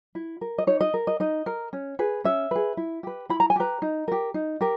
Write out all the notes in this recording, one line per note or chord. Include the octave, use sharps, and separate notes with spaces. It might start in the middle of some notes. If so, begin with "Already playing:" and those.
E4
A#4
D#5
D#4 C#5
D#5
A#4
D#5
D#4 D#5
A#4
C#4
G#4 B4
C#4 E5
G#4 B4
E4
G4 B4
E4 B5
A#5
G#5
G4 B4 A#5
D#4
G4 A#4
D#4
G4 A#4